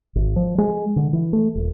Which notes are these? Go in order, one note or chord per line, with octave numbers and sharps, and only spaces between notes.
G#1
F3
G#3
D3
E3
A3
D#1